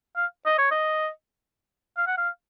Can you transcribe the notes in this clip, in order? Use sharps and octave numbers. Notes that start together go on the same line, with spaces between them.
F5
D#5
C#5
D#5
F5
F#5
F5